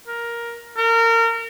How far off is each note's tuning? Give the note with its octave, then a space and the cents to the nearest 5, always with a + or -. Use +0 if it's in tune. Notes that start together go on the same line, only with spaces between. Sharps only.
A#4 +10
A#4 -30